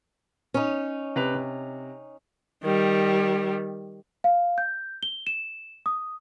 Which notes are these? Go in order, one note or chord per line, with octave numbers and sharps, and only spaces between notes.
C#4 D#4
C3 B4 F7
C3
D#3 G3
F5
G6
G7
E7
D#6